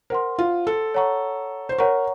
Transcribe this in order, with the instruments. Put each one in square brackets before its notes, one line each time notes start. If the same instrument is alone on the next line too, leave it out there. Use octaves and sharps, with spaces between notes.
[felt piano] A#4 [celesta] C5 F#5 C6
[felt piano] F4
A4
[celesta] C#5 F#5 A#5 C#6
[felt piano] C5
[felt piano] A#4 [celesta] C#5 F#5 A#5 C#6